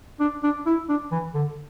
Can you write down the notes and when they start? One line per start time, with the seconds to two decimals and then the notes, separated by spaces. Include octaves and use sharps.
0.20 D4
0.43 D4
0.66 E4
0.89 D4
1.12 E3
1.34 D3